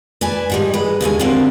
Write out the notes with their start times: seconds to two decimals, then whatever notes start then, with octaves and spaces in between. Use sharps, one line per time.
0.21 B4 D5 G#5 A5
0.50 G#2 G3 D#4
0.74 G#3 B4
1.01 D#2 D3 G#3 G#5
1.19 D3 F3 G3 A#3 C4 D4